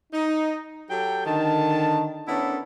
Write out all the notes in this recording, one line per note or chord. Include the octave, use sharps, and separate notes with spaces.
D#4
F#3 G4 A4 G5
D3 D#3 A5
B3 C#4 D4 E4 A4 A#4